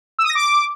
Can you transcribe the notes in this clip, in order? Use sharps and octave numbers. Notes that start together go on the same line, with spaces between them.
E6
D#6
A#6
D6